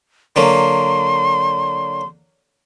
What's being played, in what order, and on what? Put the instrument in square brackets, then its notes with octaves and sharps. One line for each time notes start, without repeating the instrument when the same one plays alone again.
[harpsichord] D3 F#3 A#3 [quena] C6